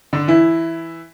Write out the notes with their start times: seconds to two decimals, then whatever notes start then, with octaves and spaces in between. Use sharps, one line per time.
0.13 D3 D4
0.28 E3 E4